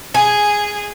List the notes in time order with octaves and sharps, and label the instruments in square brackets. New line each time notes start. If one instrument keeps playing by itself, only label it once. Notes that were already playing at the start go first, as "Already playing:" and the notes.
[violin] G#4 [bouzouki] G#5